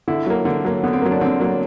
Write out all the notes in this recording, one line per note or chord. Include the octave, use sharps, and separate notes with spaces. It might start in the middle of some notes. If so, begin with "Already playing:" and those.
D3 E4
F#3 A#3
D3
F#3 A#3
D3 B3
C4
F#3 A#3
D4
D3 C4
F#3 A#3